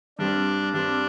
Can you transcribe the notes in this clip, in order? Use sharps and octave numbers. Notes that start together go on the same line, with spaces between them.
G2 G3 C4 D4
G2 G3 C4 D4